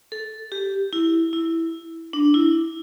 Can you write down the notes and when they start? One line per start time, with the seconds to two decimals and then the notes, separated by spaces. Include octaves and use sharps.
0.12 A4
0.52 G4
0.93 E4
1.33 E4
2.13 D4
2.34 E4